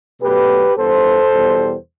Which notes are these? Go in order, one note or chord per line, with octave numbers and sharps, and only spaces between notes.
B2 F#3 A3 G4 B4
G2 E3 B3 A4 C5
E2 B2 G3 B3